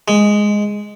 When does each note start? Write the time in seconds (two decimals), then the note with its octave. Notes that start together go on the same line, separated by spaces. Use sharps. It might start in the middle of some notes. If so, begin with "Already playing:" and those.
0.08 G#3